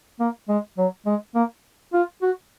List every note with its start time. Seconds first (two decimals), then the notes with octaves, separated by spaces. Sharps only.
0.20 A#3
0.49 G#3
0.78 F#3
1.06 G#3
1.35 A#3
1.94 F4
2.22 F#4